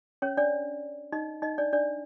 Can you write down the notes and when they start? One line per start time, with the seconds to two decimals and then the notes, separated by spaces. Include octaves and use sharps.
0.22 C#4 C#5
0.37 D4 D5
1.12 D#4 D#5
1.42 D#4 D#5
1.58 D4 D5
1.73 D4 D5